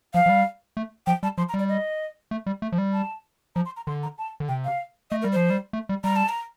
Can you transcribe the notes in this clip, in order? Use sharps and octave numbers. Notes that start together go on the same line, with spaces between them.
F3 F5
F3
G3
A3
F3 G5
G3 A5
F3 C6
A#5
G3
D5
D#5
A3
G3
A3
F3
G3
A5
F3 A#5
C6
A#5
D3 C6
A#5
A5
D3
C3 G5
F5
A3 D#5
A#4
G3
F3 C5
G3
A3
G3
G3 A#5
A5
A#5